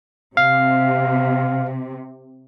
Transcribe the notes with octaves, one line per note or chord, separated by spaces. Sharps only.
C3 F5